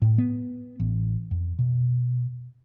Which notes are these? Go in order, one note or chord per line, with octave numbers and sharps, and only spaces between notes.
A2
B3
A1
F2
B2